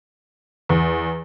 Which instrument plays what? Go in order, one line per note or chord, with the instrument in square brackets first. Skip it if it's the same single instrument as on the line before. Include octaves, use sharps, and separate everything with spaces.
[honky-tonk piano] E2